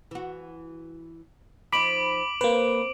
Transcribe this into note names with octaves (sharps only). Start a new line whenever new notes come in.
E3 F#4
F3 D#4 B5 D6 D7 F#7
A#3 C4 B4